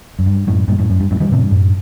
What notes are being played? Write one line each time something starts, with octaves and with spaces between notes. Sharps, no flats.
F#2
G2
F#2 A2
G2 A#2
F#2 A2
F#2
G2
F#2 A2
D#3 G3
A2 C3
G2
F#2 A2